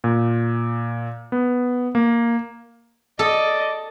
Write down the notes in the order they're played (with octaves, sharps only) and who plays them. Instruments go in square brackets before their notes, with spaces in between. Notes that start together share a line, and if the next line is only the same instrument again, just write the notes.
[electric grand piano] A#2
B3
A#3
[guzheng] A4 [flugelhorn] D5 [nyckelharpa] D#5